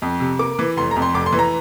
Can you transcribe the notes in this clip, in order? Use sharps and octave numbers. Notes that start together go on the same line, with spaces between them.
F2
C3
A#3 D6
E3
F1 C6
A#5
F2
C6
F1 D6
C6
E3
A#5